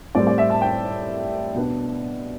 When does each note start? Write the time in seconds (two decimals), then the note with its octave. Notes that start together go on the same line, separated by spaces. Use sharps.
0.15 A2 G3 C4 D5
0.27 D5
0.38 E5
0.50 A5
0.61 G5
1.54 B2 B3 D4